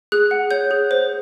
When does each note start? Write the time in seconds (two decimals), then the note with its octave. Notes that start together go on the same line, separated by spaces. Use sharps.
0.12 G#4 F#6
0.31 F#5
0.51 C#5 G6
0.71 G#4
0.91 C5